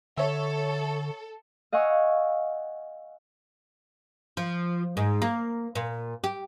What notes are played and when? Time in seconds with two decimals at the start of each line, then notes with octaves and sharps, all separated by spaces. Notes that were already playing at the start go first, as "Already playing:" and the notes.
0.17 D3 A4 C#5 E5
1.72 D#5 F5 F#5 G#5 C#6 E6
4.37 F3
4.97 G#2
5.22 A#3
5.75 A#2
6.24 G4